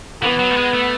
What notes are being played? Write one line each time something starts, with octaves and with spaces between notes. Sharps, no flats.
E3 B3
F#3
A3
G#3
A3